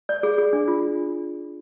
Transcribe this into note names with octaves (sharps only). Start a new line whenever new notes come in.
D5
G#4
G#4
D4
F4